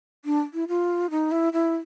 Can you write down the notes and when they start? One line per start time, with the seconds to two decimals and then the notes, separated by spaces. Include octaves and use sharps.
0.25 D4
0.54 E4
0.68 F4
1.10 D#4
1.31 E4
1.53 E4